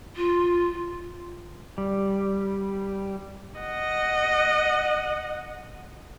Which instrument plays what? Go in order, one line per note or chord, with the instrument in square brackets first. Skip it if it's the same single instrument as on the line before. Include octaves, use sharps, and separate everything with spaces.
[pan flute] F4
[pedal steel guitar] G3
[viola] D#5 F#5